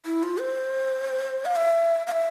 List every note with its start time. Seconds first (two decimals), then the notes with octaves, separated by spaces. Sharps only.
0.06 E4
0.23 F4
0.40 C5
1.45 F5
1.56 E5
2.07 F5
2.12 E5